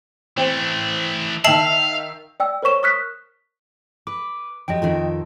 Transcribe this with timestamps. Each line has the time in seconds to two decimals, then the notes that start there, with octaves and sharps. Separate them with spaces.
0.37 E3 A3 C4
1.44 D#3 E5 F5 A5 C7 F#7
2.40 D5 G5 E6
2.63 A#4 C5 C#5 C#6 E7
2.83 C#6 D#6 F6 F#6 B6
4.07 B4 D6
4.68 F2 F#3 G4 D#5 G5
4.82 F2 D#3 F4 A4